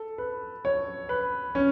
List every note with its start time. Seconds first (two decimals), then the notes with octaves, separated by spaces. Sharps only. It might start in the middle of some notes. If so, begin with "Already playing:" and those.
Already playing: A4
0.18 B4
0.65 C#5
1.09 B4
1.55 C#4